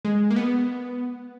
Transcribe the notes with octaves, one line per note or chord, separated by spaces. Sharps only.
G#3
A#3
B3